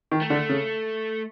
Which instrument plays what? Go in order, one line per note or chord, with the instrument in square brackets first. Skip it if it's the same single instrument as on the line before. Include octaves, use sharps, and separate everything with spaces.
[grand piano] D#3
[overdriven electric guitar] A3
[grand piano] D3
C#3